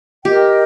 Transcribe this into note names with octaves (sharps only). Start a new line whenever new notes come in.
G4 A#4 D#5 G5